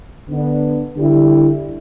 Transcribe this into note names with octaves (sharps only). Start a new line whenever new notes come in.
D3 B3 D4
D3 G3 E4